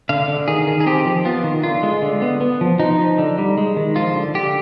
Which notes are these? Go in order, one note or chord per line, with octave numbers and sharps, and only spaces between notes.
D3 F5
D3
D#3 G#4
D#3
G#4
C4 G4
F3
B3 F4
D#3
D3 F4
G#3
D3
B3
B3
F3
F3 D#4
F3
D3
G3
G#3
D#3
F3 F4
D3
D3 G4